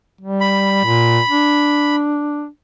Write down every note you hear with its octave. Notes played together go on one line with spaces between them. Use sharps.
G3
B5
A#2
D4